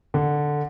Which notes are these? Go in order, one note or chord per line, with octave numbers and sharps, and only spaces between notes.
D3